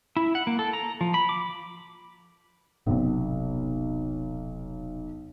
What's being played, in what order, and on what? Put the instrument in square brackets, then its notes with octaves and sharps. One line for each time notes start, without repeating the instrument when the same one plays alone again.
[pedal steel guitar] E4
F#5
A#3
A4
A#5
F3
B5
D6
[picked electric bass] D#1 C3 C4 [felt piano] B1